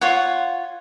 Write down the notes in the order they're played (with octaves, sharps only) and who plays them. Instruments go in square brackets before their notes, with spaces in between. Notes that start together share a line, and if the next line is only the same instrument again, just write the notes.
[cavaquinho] F4 C#5 F#5